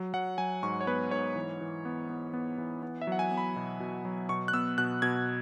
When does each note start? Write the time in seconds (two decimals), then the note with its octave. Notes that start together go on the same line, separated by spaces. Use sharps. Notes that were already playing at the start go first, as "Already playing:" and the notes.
Already playing: F#3
0.14 F#3 F#5
0.38 F#3 G#5
0.63 G#2 C#6
0.81 C#5
0.87 B3 B4
1.11 G#2 C#5
1.35 E3
1.61 E3
1.85 B3
2.09 B3
2.34 B3
2.58 E3
2.83 B3
3.01 E5
3.07 F#3 F#5
3.19 G#5
3.31 B3
3.37 B5
3.56 B2
3.80 B2
4.05 F#3
4.29 B2 C#6
4.48 F#6
4.53 B3 E6
4.78 B2 F#6
5.02 B2 G#6